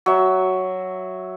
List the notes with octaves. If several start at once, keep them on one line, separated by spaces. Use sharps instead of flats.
F#3 E5